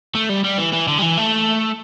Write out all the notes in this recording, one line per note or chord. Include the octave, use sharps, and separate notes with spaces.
A3
G3
G3
E3
E3
D3
G3
E3
A3